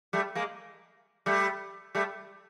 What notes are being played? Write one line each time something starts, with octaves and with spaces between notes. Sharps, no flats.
G3 A3
G#3 A#3
G3 A3
G3 A3